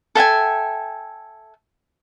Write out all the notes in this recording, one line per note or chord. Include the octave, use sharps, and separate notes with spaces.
A4 E5 G5 G#5